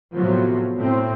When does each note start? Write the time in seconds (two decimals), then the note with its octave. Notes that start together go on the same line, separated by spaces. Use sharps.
0.16 A2 C3 F3 F#3 B3
0.78 A2 C4